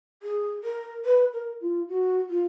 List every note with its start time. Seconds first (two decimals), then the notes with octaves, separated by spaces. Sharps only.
0.22 G#4
0.64 A#4
1.05 B4
1.33 A#4
1.61 F4
1.89 F#4
2.30 F4